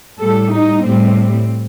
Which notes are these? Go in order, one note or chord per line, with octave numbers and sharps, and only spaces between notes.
A2 G3 A4
D#4
A2 G3 C4